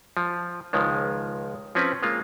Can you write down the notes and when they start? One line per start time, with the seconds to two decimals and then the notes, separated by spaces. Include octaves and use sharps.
0.17 F3
0.73 C#2 D#3 F3 G#3
1.75 F3 C4 C#4 B4
2.03 G#3 A#3 F4